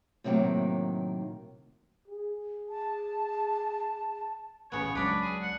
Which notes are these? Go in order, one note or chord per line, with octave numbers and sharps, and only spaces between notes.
A2 C3 D#3 F#3 A#3
G#4
A5
A1 C#3 B3 C#5
C#2 F#3 D4 B4 D5
G#4
F#5